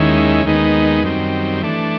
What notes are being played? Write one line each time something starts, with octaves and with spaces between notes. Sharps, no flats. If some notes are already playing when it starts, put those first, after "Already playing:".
Already playing: D#2 D#3 G#3 C#4 E4
D#2 D#3 G#3 B3 D#4
F#2 D#3 G3 C4
E3 A3 D4